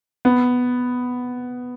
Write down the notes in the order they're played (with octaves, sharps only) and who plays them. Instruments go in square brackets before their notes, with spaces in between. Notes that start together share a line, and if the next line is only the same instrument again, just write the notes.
[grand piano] B3